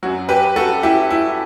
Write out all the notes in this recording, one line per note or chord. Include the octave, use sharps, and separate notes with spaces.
F#2 F#3 F#4
G4 B4
F#4 A4
E4 G4
E4